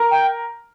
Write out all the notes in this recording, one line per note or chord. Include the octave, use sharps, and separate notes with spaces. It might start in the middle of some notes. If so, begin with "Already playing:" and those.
Already playing: A#4
G5